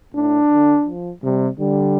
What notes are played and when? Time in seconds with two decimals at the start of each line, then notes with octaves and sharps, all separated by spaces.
0.14 A2 D4
0.50 D3
0.86 F3
1.23 C3 G3
1.59 D3 G3